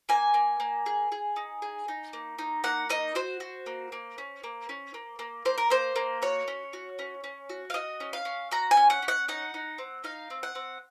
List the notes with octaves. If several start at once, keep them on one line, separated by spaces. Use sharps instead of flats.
A#3 G#5
A#3
A#3
G#4
G#4
D#4
G#4
D#4
A#3
D#4
A#3 F#5
D#4 D#5
F#4 C5
F#4
A#3
A#3
C#4
A#3
C#4
A#3
A#3
A#3 C5
A#4
A#3 C5
A#3
F#4 C#5
C#4
F#4
C#4
C#4
F#4
F5
F#4 D#5
C#4
F5
C#4
F#4 A#5
G#5
C#4
F#5
C#4
F#5
D#4 F#5
D#4
C4
D#4 F5
C4
F#5
C4